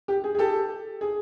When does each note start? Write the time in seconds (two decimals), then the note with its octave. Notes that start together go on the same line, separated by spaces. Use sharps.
0.08 G4
0.24 G#4
0.35 G#4
0.39 G4 A4
1.01 G#4